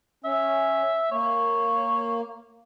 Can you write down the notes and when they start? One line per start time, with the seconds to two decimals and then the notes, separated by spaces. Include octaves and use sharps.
0.24 C#4 E5
1.11 A#3 C#5